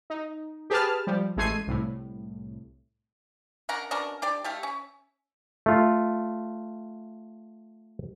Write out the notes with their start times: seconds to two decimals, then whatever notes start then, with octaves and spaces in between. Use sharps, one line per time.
0.10 D#4
0.70 G4 G#4 B4 A5 F6
1.07 F3 G3
1.37 A1 G#3 A3 G#6 C7 D#7
1.67 C2 A2
3.69 C#4 D4 A#4 F#5
3.91 B2 C#4 D4 A#4
4.22 D4 G4 D5
4.44 A3 G4 F5
4.63 C#4
5.66 A3 F4